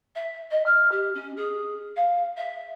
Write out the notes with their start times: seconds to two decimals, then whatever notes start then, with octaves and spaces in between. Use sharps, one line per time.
0.15 E5
0.50 D#5
0.66 F6
0.91 G4
1.14 C#4
1.36 G#4
1.96 F5
2.37 E5